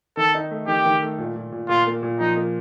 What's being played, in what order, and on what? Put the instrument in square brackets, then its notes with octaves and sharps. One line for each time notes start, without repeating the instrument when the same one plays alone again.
[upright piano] D#3 [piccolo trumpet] A4
[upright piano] D#4
A3
[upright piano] D#3 [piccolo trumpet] G4
[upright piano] D#3
A3
A#2
A#2
A#2
[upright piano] A#2 [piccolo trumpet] F4
[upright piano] A#3
A#2
[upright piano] F3 [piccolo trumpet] D#4
[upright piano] A#3